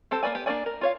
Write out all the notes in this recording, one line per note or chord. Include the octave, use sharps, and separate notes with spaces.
C4 G4 A4 C5
A#3 A#4 B4 D5 G#5
B3 G4
A#3 D4 F#4 D5 G#5
A#4
F4 C#5 F5